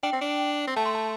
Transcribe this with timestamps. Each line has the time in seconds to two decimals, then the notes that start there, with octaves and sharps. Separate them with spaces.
0.03 D4 G5
0.13 C4
0.21 D4
0.68 C4
0.76 A3 A5
0.86 C6
0.95 A5